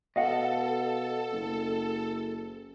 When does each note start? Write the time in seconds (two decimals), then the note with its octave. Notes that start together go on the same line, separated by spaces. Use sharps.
0.16 B2 A4 D#5 F5 F#5
1.32 F#1